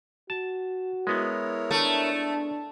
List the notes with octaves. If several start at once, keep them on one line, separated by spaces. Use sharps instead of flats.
F#4 A5
G#3 B3 E4 A#4 C#5
A3 D4